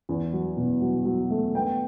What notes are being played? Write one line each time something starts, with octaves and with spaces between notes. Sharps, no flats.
E2
F#3
B2
F#3
F#3
A3
B3 G5